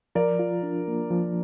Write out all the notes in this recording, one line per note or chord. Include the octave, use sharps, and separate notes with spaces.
F3 A#4 D5
F4
D4
A#3
F3